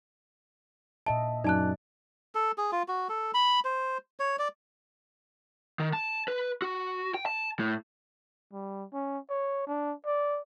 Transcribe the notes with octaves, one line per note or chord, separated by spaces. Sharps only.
A#2 D#5 E5 A5
F#2 D#4 D5 A5 F#6
A4
G#4
F4
F#4
A4
B5
C5
C#5
D5
D#3
A5
B4
F#4
G5
A5
A2
G3
C#4
C#5
D4
D5